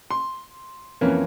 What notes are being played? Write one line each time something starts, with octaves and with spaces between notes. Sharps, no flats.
C6
F2 E3 A#3 C#4